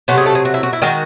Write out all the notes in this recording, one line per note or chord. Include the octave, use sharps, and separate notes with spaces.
C3 F#3 A3 F#4
G#4
A4
G#4
F#4
E4
F#4
E4
D#3 G#3 F#4